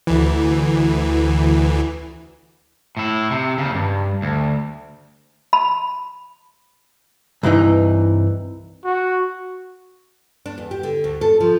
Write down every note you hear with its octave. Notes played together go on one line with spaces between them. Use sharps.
D2 E3
A2 E4
C3
D#2 C#3
G2
D2
B5
C2 G2 E3 D#4
F#4
D4
E2
G4
D3
D2
A4
F3